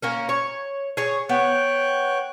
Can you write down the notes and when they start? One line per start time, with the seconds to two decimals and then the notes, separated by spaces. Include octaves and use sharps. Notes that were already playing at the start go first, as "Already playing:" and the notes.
0.02 A#3 C#4 A#4
0.29 C#5
0.97 G#4 C#5
1.29 B3 C#5 G5 F#6